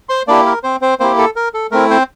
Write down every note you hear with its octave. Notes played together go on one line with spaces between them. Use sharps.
C5 C6
A#3 D4 E4 G4 D5
A#4
C4 C5
C4 C5
A#3 C4 E4 G4 C5
A4
A#4
A4
A3 C4 E4 A#4
C4 C5